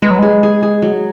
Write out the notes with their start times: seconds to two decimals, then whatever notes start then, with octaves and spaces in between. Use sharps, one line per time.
0.02 G#3 B4
0.11 F#3
0.19 G#3 G#4
0.43 G#4
0.63 G#4
0.82 F#3